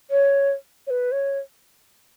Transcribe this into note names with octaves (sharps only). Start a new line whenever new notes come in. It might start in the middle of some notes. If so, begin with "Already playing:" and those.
C#5
C#5
B4
C#5